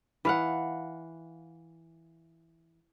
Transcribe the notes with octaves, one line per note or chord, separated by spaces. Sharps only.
E3 F5 F#5